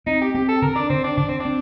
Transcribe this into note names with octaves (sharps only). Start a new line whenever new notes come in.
C4 D#4
G4
C4 G4
A4
D3 A#4
D4
D3 C4
D4
D3 D4
C4
D4
C4